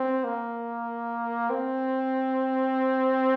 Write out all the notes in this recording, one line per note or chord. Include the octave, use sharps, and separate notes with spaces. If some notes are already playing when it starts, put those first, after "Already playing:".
Already playing: C4
A#3
C4